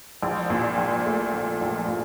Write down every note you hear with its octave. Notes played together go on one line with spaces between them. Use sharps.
A#1
A#2
A#1
A3
A#1
A#1
A#2